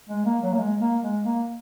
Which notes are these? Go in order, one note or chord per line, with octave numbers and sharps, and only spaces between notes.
G#3
A#3
F#3
A#3
G#3
A#3
G#3
A#3